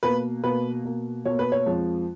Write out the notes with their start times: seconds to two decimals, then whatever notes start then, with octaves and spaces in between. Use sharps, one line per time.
0.03 B2 A#3 B4
0.44 B2 A#3 B4
0.84 B2 A#3
1.25 B2 A#3 C#5
1.39 B4
1.52 C#5
1.66 F2 F3 G#3